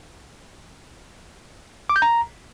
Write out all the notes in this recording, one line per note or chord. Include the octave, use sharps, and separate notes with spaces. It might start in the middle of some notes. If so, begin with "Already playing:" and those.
D6
G6
A#5